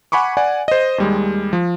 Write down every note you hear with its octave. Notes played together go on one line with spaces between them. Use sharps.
F#5 G#5 B5 C#6 D6
D5 F#5 G#5
C5 D#5
D#2 G3 G#3
F3